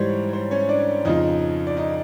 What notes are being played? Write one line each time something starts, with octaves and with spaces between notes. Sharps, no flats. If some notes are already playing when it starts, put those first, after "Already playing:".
Already playing: G#2 E3 G3 C5 C#5
C5
C#4 C#5
D4 D5
F2 C#3 F3 D#4 D#5
D5
D#4 D#5